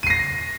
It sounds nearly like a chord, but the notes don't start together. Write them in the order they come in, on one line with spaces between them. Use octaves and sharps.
D#7 C7 A#6